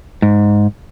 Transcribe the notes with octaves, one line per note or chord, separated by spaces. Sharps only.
G#2